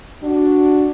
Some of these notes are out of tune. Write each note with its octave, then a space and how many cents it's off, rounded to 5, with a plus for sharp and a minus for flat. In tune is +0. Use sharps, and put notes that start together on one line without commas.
D4 +0 F#4 +0